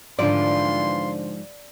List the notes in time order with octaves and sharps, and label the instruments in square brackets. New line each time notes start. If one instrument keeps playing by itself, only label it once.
[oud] G#2 F3 [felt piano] D3 C5 [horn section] E3 F4 C6 [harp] D5